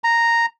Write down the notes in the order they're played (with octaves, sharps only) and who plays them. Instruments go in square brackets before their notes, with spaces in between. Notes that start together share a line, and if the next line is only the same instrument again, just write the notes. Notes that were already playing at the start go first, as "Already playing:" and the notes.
[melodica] A#5